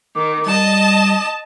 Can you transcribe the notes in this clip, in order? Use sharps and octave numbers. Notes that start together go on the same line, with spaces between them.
D#3 D6
G3 D#5 A5